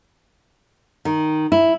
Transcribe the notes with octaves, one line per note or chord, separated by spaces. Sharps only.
D#3
E4